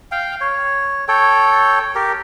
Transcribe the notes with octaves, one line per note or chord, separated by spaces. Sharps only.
F5 G5
C#5
A4 C#5 G5
G4 A#4